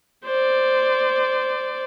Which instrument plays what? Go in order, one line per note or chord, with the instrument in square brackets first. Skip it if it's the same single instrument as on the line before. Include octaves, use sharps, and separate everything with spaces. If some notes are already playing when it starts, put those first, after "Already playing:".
[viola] C5 D5